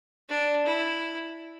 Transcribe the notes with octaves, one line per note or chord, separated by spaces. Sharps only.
D4
E4